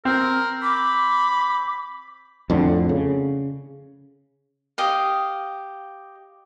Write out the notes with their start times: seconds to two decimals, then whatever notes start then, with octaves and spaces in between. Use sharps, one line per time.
0.05 C4 A#4
0.63 B5 D6
2.50 F2 A2 D3
2.89 C#3
4.78 G4 D#5 F5